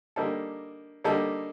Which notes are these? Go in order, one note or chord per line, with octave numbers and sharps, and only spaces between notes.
D3 G3 A#3 D#4 A4
D3 G3 A#3 D#4 A4